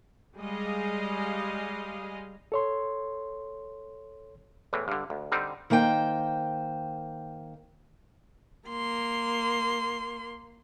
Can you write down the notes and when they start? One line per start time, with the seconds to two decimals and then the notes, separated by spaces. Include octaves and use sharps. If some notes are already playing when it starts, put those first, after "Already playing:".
0.36 G3 G#3 G#4 D#5 F5
2.52 A4 C#5 C6
4.73 E2 A2 E3
4.88 G2 D3
5.10 D2
5.32 D3 G3 C4 D#4
5.70 D#3 A#3 C5 G5
8.69 A#3 C6